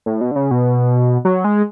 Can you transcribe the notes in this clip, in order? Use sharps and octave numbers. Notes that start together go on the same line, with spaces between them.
A2
B2
D3
C#3
B2
F#3
G#3